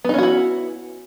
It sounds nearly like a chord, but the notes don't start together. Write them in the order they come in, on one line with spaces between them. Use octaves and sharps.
B3 D#4 C#4 F#4 E4